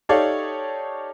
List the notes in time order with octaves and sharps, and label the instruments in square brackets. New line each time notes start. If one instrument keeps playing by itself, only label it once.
[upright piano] D#4 G4 A4 C#5 D5 F5